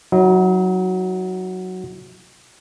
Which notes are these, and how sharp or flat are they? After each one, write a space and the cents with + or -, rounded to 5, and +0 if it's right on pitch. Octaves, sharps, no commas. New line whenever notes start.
F#3 +0 D#4 +45